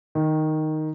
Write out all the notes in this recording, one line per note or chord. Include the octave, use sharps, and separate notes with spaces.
D#3